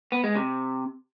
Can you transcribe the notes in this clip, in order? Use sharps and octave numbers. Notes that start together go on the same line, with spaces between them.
B3
G#3
C3